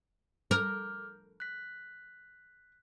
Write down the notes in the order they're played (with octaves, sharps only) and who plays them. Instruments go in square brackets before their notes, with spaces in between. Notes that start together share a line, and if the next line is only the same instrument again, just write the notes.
[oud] A#4 [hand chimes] D6 F6 G6
[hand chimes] F#6 B6